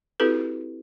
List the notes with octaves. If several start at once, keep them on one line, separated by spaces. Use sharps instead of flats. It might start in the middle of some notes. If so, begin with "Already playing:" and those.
C4 E4 F#4 G4 A4 B4